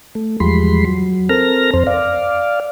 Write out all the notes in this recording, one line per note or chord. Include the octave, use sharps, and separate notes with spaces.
A3
E2 F3 G3 G#3 B5 C6
F#3
C4 A4 A#4 F6 A#6
F2 C4 C5
D5 F5